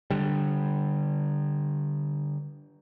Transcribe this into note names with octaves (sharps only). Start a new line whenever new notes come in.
D3 G3